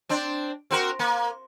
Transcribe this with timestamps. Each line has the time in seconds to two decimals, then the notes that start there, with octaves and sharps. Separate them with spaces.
0.09 C4 D4
0.71 C4 F#4 A#4
0.99 A#3